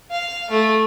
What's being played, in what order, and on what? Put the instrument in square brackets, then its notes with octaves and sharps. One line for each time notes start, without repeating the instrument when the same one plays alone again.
[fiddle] F5
A3